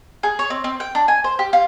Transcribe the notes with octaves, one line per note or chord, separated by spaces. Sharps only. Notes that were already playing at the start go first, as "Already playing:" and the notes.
G#4
C#5
C4
C4
G5
D4
G#5
C5
G4
F4